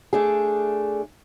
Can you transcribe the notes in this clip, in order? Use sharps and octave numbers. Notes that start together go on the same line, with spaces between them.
A3 D4 G#4